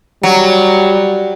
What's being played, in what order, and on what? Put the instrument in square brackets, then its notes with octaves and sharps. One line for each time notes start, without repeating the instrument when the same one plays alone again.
[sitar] F#3 [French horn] G3